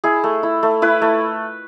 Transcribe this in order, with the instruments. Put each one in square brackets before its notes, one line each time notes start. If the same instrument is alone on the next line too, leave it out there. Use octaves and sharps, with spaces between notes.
[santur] E4 G#4
A3
E4
A3
E4 B4
A3